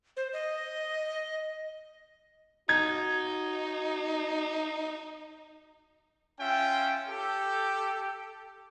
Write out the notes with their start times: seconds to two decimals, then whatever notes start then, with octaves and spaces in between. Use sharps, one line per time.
0.17 C5
0.33 D#5
2.69 D#4 F#4 G#6
6.40 C#4 F4 E5 G5
7.08 G4 A4